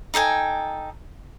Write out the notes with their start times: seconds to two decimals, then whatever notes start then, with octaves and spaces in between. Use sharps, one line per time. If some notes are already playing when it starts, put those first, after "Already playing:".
0.14 D#4 A4 G5 G#5